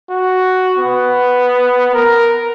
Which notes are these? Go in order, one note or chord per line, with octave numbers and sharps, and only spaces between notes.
F#4
B3
A#4